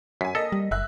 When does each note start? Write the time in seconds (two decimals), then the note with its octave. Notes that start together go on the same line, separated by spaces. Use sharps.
0.21 F#2 G#5 B6
0.35 A#3 A4 D#5 A#6
0.52 G3
0.71 F#1 E5 F#6